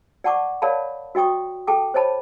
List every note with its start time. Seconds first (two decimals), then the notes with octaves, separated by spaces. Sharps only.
0.24 D5 F#5 A5 C#6 D6
0.62 A#4 C#5 D5 F5 A5 B5
1.15 F#4 D#5 G5 C#6 D#6
1.67 A4 G5 A5 D6
1.94 C5 C#5 D#5 A5 B5